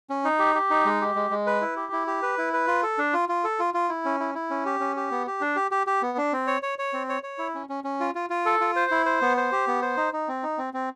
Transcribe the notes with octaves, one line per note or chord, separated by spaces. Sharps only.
C#4
D#4
G4
G4
D#4
G#3
G4
G#3
G#3
B4
E4
G4
E4
G4
B4
E4
B4
F4
A4
D4
F4
F4
A4
F4
F4
E4
C#4
E4
E4
C#4
G4
C#4
G4
B3
G4
D4
G4
G4
G4
B3
D4
C4
C#5
C#5
C#5
C4
C#5
C#5
E4
C#4
C#4
C#4
F4
F4
F4
A4
F4
C5
E4
C5
B3
C5
G4
B3
C5
D#4
D#4
C4
D#4
C4
C4